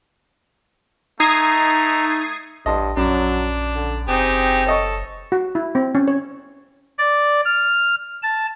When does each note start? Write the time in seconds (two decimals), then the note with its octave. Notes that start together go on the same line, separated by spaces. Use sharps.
1.20 A3 D#4 A#5 D#6 G#6 C7
2.66 A1 G2 D#5 A5 C6
2.97 A#1 F#2 F#3 D4
3.75 D3
4.08 F#1 C4 D#4 G4 G#4
4.67 A4 C#5 D#5 C#6
5.32 F#4
5.55 E4
5.75 C4
5.95 C#4
6.08 C#5
6.98 D5
7.45 F6
8.22 A5